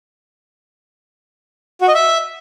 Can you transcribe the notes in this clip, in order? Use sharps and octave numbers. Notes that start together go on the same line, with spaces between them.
F#4
D#5
E5